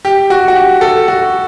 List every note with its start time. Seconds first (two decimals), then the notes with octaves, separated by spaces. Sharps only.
0.05 G4
0.30 F#4
0.48 F#4
0.55 G4
0.81 A4
1.08 F#4